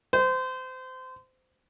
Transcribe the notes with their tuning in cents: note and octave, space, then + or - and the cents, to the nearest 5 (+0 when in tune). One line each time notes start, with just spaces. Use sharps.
C5 -25